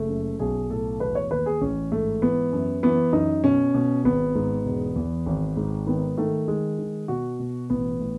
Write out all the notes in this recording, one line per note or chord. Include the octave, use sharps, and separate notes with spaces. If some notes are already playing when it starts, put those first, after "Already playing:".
Already playing: F#1 A3
F#2
B1 G#4
A2 A4
E1 B4
C#5
D#2 B4
G#4
A1 C#4
G#2 A3
E3 B3
F#2
E3 B3
F#2 D#4
B2 C#4
B2
G#1 B3
G#2
E1
E2
G#1
G#2
D#3 B3
D#3 A3
D#3 G#3
D#3
B2 F#4
B2
A1 B3
A2